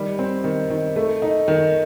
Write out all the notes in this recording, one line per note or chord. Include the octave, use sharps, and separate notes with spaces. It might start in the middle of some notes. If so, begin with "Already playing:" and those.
Already playing: D#3 G3
C4
D#3
D#3
A3
D#4
D#3